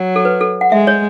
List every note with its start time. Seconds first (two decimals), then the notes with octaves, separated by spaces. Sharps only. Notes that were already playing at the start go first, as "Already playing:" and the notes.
Already playing: F#3
0.16 A4
0.25 B4
0.41 A4
0.61 F#5
0.72 G#3 E5
0.87 C#5